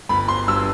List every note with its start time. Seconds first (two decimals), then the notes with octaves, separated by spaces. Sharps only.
0.09 G1 B5
0.28 C6
0.48 G2 E6